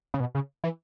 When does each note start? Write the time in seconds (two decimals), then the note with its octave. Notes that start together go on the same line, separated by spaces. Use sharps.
0.14 C#3
0.20 B2
0.35 C#3
0.64 E3